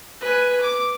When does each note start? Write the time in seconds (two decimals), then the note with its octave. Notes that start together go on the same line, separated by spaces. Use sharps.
0.20 B4 G#5
0.61 D6